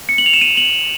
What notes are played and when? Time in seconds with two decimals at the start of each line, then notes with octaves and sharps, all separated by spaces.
0.09 C#7
0.18 F#7
0.26 F7
0.33 E7
0.41 D#7
0.57 F#7